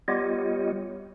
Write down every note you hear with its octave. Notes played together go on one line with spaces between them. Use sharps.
G3 B3 F4 G4 C#5 D#5